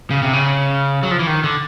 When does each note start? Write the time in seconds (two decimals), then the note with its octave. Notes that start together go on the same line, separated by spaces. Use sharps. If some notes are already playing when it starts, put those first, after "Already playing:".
0.11 C#3
0.22 C3
0.33 C#3
1.03 F#3
1.11 F3
1.19 E3
1.27 D#3
1.44 D3